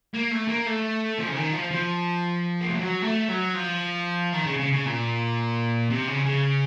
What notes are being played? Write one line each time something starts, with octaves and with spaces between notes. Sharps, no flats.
A#3
A3
A#3
A3
F3
C#3
D#3
F3
F3
A#3
A3
F#3
A3
F#3
F3
D#3
C#3
C#3
C#3
A#2
C3
C#3
C#3